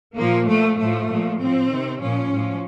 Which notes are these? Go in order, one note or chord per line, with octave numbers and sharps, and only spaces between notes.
A#2 F3 A#3
A#2 F3 A3
A2 F3 A3
A#2 F3
A2 F3 C4
C3 D#3
A#2 F3 C#4
A2 F3